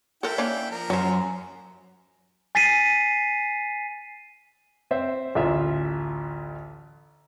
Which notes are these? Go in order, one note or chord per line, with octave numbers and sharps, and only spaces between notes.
E4 A4 A#4 G5
A#3 C#4 D4
F3 A#4
F#2 C#4 C5
G#5 A6 B6 C7 D#7
C4 C5 E5
A1 D2 F4 E5